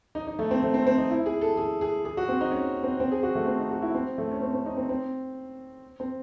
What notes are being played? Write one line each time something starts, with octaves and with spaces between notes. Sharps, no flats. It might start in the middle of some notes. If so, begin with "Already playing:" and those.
D#4
D#4
A3
C4
A3
C4
C4
D#4
E4
G#4
A4
G#4
G#4
G#4
F#4
C4
D#4
C#4
C4
C4
G#4
F#4
A3
C4
D#4
F#4
E4
C4
A3
C#4
C4
C4
D#4
C4
C4
C4